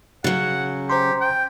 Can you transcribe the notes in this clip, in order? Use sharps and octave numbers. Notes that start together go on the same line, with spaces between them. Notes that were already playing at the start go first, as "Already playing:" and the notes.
C#3 F#3 F#5
G4 C5 A#5 C6
G5